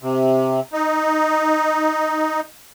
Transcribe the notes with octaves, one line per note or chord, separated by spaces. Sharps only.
C3
D#4